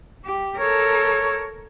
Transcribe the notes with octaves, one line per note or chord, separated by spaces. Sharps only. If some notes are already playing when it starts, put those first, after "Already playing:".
G4
A4 A#4 C#5